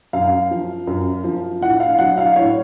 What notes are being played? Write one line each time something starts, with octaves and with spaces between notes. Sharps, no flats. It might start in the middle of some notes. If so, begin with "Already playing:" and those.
F#2 F5
F3
F#2
F3
A2 F#5
F5
F#3 F#5
F5
A2 C#5